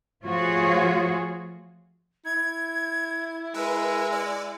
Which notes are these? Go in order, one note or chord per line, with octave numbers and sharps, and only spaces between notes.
F3 A3 F4 F#4 G#4 C#5
E4 G#6
G#3 A#4 B4 E6
D5